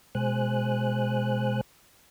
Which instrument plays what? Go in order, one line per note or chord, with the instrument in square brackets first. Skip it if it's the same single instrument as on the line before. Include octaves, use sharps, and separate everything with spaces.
[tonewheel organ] B2 G#3 C5 G#5 F#6